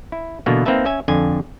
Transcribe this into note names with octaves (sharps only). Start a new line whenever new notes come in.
E4
B2 D3 E3 A#3 B3
A#3 C4 D#4 B4 E5 A5
C#4 E5 G#5
F2 D3 G#5